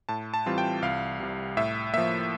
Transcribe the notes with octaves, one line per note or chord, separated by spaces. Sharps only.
A2 A5
A5
E3 G3 C4 F4
G5
C2 F5
C3 G3
A2 E5
F3 A#3 E5